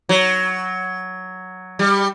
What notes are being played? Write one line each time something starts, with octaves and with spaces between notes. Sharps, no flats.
F#3
G3